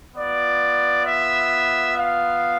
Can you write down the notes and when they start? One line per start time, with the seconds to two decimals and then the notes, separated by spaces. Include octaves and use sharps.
0.16 B3 F4 D5
1.06 E5
1.97 F5